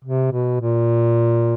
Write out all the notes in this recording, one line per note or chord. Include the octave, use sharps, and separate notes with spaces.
C3
B2
A#2